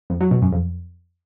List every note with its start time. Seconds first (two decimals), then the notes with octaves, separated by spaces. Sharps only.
0.10 F2
0.21 F#3
0.31 B2
0.42 F#2
0.52 F2